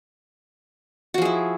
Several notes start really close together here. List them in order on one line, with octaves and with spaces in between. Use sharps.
F#4 F3 G#4 E4